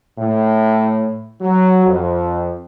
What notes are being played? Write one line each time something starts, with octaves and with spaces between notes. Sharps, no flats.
A2
F#3
F2